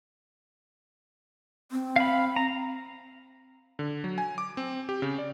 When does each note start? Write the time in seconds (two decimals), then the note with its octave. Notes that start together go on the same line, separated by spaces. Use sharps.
1.72 C4
1.96 F5 B5
2.36 A#5
3.79 D3
4.04 F#3
4.18 G#5
4.38 D6
4.57 C4
4.89 G4
5.02 C#3
5.18 D5